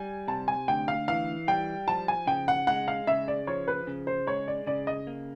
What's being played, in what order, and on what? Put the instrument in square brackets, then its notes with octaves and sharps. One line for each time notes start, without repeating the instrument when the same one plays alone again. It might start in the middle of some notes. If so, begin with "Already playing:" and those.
Already playing: [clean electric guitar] G3 [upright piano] G#5
[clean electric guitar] C3 [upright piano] A5
[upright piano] G#5
[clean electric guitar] D2 [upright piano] G5
[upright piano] F5
[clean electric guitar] E3 [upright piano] F5
[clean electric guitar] G3 [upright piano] G5
[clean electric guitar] F3 [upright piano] A5
[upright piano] G#5
[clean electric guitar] C#3 [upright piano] G5
[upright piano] F#5
[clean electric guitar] G#3 [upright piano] F#5
[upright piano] F5
[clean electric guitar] C#3 [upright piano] E5
[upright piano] D5
[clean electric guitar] F3 [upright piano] C#5
[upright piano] B4
[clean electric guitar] C#3
[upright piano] C5
[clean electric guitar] G#3 [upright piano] C#5
[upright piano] D5
[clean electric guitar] C#3 [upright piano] D5
[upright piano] D#5
[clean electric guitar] A#3